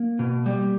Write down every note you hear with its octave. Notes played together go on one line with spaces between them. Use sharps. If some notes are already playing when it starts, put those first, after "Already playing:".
Already playing: A#3
B2
G3